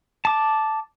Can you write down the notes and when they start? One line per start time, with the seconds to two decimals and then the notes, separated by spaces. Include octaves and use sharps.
0.25 A5 D6